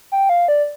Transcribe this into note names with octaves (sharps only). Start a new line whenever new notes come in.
G5
F5
D5